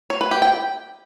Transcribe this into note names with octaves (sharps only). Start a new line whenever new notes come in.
C#5
B4
G4
G5